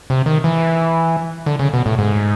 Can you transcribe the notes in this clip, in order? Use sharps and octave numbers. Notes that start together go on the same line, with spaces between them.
C3
D#3
E3
D3
C#3
B2
A2
G#2